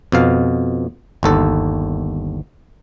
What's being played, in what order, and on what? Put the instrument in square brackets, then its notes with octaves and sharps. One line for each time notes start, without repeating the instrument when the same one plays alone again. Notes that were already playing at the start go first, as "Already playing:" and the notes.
[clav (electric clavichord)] F2 B2 F5
G1 D#2 A4